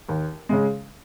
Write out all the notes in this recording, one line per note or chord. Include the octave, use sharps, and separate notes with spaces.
D#2
C#3 G#3